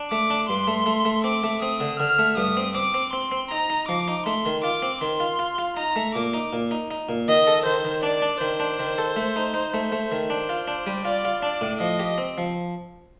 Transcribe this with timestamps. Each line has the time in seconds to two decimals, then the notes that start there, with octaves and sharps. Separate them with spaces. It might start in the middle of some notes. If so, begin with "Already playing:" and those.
Already playing: D4
0.11 A3 D6
0.30 D4
0.49 G2 C6
0.67 A3
0.86 A3
1.05 A3
1.24 C4 D6
1.43 A3
1.62 C4 D#6
1.80 D3
1.99 D3 F6
2.19 A3
2.37 G2 D#6
2.57 C4
2.75 C4 D6
2.94 C4
3.13 C4 C6
3.31 C4
3.51 D#4 A#5
3.70 D#4
3.88 F3 D6
4.08 D#4
4.26 A3 C6
4.46 D#3
4.64 F4 D6
4.82 C4
5.01 D#3 C6
5.20 F4
5.39 F4
5.58 F4
5.77 D#4 A#5
5.96 A3
6.15 A#2 D6
6.34 D#4
6.53 A#2
6.71 D#4
6.91 D#4
7.09 A#2
7.28 D#3 D#5
7.47 A4
7.65 D#3 C5
7.84 D#3
8.03 D4 D5
8.22 D4
8.41 D#3 C5
8.60 D4
8.79 D#3
8.98 A4
9.16 A3
9.36 D#4
9.54 D#4
9.74 A3
9.92 A3
10.11 D#3
10.30 D4 C5
10.49 F4
10.67 D4
10.86 G3
11.05 F4 D5
11.25 F4
11.42 D4 D5
11.61 A2
11.80 F3 D#5
12.00 G4
12.18 C4
12.38 F3